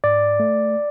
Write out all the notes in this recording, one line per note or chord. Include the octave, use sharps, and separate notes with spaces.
G#2 D5
A3